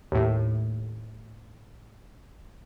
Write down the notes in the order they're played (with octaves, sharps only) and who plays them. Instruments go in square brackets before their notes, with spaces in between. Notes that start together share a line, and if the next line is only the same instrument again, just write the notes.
[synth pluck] D#2 A2